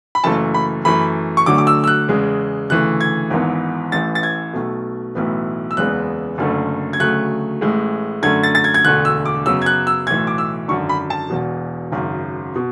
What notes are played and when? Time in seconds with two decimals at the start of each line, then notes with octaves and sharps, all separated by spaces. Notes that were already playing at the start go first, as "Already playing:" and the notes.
0.15 B5
0.24 F#1 F#2 E3 A3 A5
0.54 B5
0.85 F#2 E3 A3 B5
1.37 C#6
1.46 D2 D3 F#3 A3 D6
1.58 D6
1.67 E6
1.84 E6
1.87 F#6
2.08 E2 C#3 G#3
2.70 D2 C#3 E3 A3 F#6
3.01 G#6
3.30 G#1 G#2 E3 B3
3.92 A1 A2 E3 A6
4.15 A6
4.23 G#6
4.53 B1 B2 A3
5.15 B1 A2 E3 B3
5.71 E6
5.77 F#1 E2 C#3 G#3 B3 F#6
6.38 F#1 F#2 D3 A3
6.93 G#6
7.00 D2 C#3 F#3 A3 F#6
7.61 A1 A2 G#3
8.22 F#2 D3 A3 G#6
8.43 A6
8.55 A6
8.64 G#6
8.74 G#6
8.84 E1 D2 D3 A3 F#6
9.05 E6
9.25 D6
9.46 F#2 C#3 F#3 B3 E6
9.62 G#6
9.66 F#6
9.87 E6
10.07 B1 A2 E3 G#6
10.27 D6
10.38 E6
10.68 G#1 F#2 D3 C#6
10.89 B5
11.10 A5
11.30 E1 E2 B2
11.92 G#1 F#2 C#3
12.56 B2